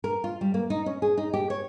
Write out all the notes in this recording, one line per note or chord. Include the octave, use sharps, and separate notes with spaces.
A#4
F4
G3
A#3
D#4
C#4
G#4
D#4
G4
C#5